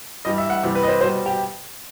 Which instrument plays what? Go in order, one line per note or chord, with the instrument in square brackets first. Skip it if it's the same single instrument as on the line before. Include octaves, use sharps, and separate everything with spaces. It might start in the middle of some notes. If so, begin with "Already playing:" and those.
[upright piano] G2 E3 G3 D#5
E5
F#5
E2 C3 E3 G3
B4
D#5
C5
B2 C5
G3
G4